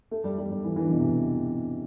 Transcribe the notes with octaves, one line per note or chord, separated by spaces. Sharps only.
A3
G3
G3
G3
E3
E3
D3
B2
C3